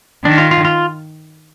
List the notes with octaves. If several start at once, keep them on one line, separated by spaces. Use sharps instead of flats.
D#3 D4
F4
F4
F4